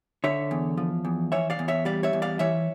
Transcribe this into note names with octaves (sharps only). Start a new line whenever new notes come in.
D3 C#5 E5
E2
F3
E2
E3 C#5 E5
D5 F5
E2
C#5 E5
G3 D5 F5
C#5 E5
E2
D5 F5
E3 C#5 E5